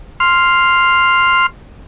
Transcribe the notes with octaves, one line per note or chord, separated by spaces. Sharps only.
C6 F6